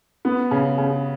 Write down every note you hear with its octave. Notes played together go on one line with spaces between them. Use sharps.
B3
C#3
C#3